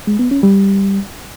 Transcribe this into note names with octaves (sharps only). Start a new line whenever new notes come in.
G#3
B3
C#4
G3